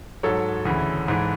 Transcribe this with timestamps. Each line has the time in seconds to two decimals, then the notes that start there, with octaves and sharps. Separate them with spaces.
0.23 G#2 F#3 A4 C#5
0.65 D2 C#3 E3
1.08 G#2 E3